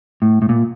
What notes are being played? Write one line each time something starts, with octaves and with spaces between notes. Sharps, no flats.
A2
A2
A#2